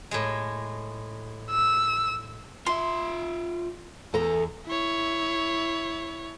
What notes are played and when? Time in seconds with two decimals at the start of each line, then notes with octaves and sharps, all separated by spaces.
0.11 A2 G#3
1.51 E6
2.66 F4 E5 C6
4.14 E2 A4 A#5
4.66 E4 C#5